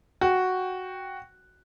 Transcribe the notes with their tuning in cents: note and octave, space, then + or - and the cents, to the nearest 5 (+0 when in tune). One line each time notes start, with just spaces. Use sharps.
F#4 +0 G5 +0